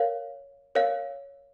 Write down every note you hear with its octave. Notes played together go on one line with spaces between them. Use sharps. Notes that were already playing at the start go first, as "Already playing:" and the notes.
Already playing: A#4 C#5 F5
A#4 C#5 F5